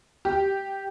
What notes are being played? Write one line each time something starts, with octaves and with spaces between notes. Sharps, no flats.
G4